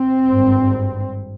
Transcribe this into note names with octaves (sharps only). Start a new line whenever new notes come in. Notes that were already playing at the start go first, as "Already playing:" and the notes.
Already playing: C4
G#1 G2